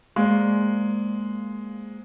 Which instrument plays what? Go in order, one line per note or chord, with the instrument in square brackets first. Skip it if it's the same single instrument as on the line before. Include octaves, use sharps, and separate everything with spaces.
[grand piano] G#3 F5 [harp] A#3 C5 D5